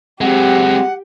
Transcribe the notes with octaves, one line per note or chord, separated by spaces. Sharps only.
F#3 G#3 C4 G4 F#5